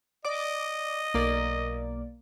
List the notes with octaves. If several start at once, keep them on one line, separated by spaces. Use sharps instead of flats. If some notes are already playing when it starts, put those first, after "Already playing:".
D5 D#5 D6
B1 A#3 D5